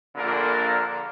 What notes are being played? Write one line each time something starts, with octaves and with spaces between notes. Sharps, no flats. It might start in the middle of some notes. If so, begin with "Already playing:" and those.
A#1 A#2 D3 A#3 A4 A#4